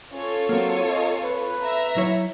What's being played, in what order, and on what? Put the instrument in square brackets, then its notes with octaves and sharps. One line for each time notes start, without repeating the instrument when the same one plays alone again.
[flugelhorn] C#4 [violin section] F4 A4 C#5
[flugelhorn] F#3 [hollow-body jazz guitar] A#3 C4
[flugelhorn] D#5
B4
[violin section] E5 A#5
[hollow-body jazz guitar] F#3 E4 C#5